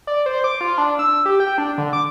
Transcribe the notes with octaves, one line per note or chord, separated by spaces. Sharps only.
D5
C5
D6
F4
D4
E6
G4
G5
D4
D3
D6